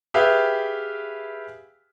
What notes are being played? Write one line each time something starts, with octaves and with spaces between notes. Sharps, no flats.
G4 G#4 B4 E5 F5 G5